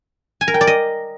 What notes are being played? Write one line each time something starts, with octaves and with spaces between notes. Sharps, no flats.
G#5
A#4
G5
D5
D#5